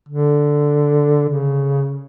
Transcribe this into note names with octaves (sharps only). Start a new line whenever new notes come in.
D3
C#3